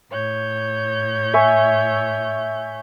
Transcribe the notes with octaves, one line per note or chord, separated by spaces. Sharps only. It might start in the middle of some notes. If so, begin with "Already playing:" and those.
A2 C#5 G6
E5 G#5 C#6